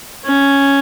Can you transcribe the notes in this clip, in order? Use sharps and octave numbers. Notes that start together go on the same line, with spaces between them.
C#4